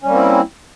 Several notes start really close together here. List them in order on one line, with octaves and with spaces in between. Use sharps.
C#4 G3 A#3 C4 E4